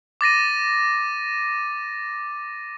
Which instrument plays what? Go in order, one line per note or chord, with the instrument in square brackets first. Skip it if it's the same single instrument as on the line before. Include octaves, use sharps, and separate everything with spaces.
[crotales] D6 A6 A#6 D#7